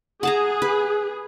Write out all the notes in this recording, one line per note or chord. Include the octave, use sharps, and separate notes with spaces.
G#4 F#5 A5 A#5
B4